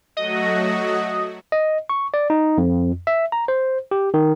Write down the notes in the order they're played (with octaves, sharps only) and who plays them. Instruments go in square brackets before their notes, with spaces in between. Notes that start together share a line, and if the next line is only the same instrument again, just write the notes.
[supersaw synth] F#3 A3 F#4 [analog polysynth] D#5
[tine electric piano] D#5
C#6
D5
D#4
F2
E5
A#5
C5
G4
D#3